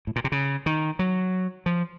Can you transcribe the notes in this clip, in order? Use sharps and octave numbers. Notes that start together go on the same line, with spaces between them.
A2
A#2
C3
C#3
D#3
F#3
F3